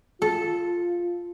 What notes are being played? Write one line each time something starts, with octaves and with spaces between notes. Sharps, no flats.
F4 A4